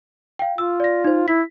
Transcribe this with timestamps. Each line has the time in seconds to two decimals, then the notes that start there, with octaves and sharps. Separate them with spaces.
0.39 F5 G5
0.58 F4 E6
0.80 D5 A#6
1.04 D#4 C5
1.28 E4 B6